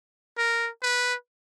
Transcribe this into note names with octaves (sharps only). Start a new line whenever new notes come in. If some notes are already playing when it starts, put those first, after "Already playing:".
A#4
B4